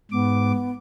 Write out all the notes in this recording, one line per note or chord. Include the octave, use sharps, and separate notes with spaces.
G#2 B3 D6